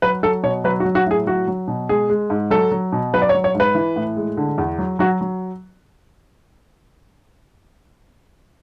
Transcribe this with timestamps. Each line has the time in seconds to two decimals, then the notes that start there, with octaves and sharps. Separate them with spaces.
0.02 F#3 B4
0.23 F#3 A4
0.43 B2 C#5
0.64 F#3 B4
0.80 F#4
0.85 F#3
0.95 F#4
1.06 A2 G#4
1.27 F#3 F#4
1.47 F#3
1.68 B2
1.89 G#3 G#4
2.09 G#3
2.30 G#2
2.51 F#3 A4
2.71 F#3
2.92 B2
3.13 F#3 B4
3.22 D5
3.29 C#5
3.34 F#3
3.44 C#5
3.54 G#2
3.60 B4
3.75 E3
3.96 A2
4.16 G#3
4.37 D3
4.58 E2
4.78 F#3
4.99 F#3 F#4
5.21 F#3